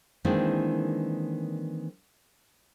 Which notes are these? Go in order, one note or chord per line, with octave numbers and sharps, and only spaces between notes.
D#3 E3 G#3 A#3 C4 D4